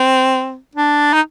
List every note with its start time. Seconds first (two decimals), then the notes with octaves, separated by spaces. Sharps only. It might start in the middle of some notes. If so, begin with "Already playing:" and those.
Already playing: C4
0.75 D4
1.13 D#4